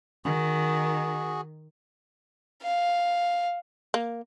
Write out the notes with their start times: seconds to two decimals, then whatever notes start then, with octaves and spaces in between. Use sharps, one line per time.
0.25 D#3 F#4 G#4
2.63 F5
3.94 A#3